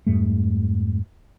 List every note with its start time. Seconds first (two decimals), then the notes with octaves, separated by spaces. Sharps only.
0.07 F2 G#2 G3 A3